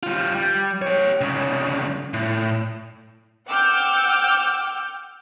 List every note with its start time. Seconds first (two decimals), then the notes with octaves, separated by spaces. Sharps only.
0.03 G3 F4
0.35 G3
0.82 G4 C#5
1.21 C2 C#3
2.14 A2
3.46 F#5 G5 D6 E6 F6 G6